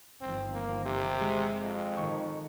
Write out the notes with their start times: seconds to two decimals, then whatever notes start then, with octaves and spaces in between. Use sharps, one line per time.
0.21 G1 D#3 F3 C4
0.54 A#3
0.85 C3 G4
1.21 G#3
1.61 F2
1.97 D#3 C#6